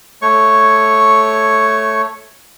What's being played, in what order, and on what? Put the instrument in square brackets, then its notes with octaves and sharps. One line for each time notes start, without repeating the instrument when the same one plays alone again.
[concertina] A3 C#5 C#6